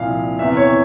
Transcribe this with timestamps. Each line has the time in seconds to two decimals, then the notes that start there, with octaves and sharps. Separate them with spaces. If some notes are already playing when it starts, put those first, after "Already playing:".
Already playing: C2 A#2 F3 F5
0.39 E2 C3 E3 E5
0.57 C#5